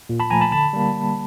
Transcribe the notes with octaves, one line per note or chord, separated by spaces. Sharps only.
A#2
A5 B5
F3 A3 G#5 A#5
A5 B5
D3 A5 B5
G3 A#3